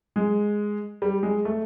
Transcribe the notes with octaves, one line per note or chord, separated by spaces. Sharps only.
G#3
G3
G#3
A3